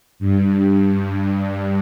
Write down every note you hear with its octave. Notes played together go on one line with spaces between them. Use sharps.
G2
G2